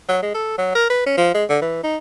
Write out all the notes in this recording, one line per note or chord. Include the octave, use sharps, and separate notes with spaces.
F#3
G#3
A4
F#3
A#4
B4
C#4
F3
G#3
D3
E3
D#4